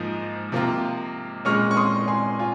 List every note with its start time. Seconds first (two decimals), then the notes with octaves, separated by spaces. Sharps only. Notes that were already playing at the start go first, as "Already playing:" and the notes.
Already playing: G#2 F3 A#3 D#4
0.52 C3 F3 A#3 F4
1.45 A#2 G#3 C#4 C#6 F6
1.71 C#6
1.77 C6 D#6
2.07 G#5 C6
2.39 F4 G#5